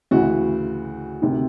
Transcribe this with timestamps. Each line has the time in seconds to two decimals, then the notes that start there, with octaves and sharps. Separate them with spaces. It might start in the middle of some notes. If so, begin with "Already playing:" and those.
0.11 D2 C#3 E3 E4 F#4
1.22 D2 C3 D#3